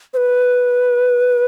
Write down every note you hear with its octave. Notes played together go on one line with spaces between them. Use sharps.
C5
B4